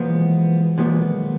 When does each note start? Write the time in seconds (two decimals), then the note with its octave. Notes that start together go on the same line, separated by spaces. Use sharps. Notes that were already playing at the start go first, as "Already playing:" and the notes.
Already playing: B1 A#2 E3 F3 G#3 B3
0.77 B1 A#2 E3 F3 G#3 B3
1.00 D#3
1.23 D#3